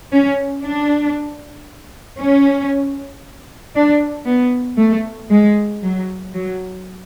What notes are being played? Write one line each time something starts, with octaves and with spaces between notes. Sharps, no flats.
C#4
D4
C#4
D4
B3
A3
G#3
F#3
F#3